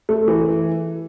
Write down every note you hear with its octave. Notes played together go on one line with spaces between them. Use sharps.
A3
E3